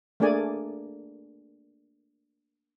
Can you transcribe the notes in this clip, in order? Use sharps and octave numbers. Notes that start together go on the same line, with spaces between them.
A3 A#3 D4 G#4 D5 G#5